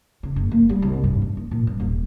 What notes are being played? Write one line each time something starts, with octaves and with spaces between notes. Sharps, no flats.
C#3
F#1
A#3
G3
C2
G2
D4
D#2
A#2
G2
D#1